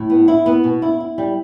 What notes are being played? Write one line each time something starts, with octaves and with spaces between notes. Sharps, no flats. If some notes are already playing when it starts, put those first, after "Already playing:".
Already playing: A2
B3
E4
B3
B2
E4
E4
G3